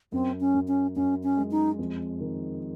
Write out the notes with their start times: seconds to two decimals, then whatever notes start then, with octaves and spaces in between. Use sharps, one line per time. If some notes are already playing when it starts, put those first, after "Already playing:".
0.12 F#2 C4
0.40 C#4
0.54 F#2
0.68 C#4
0.96 F#2 C#4
1.23 C#4
1.37 G#3
1.51 D#4
1.79 F2
2.21 D#3